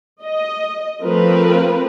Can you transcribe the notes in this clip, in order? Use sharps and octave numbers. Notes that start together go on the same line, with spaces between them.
D#5
F3 A3 C4 A#4 B4